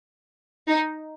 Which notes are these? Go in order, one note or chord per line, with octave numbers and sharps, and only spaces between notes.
D#4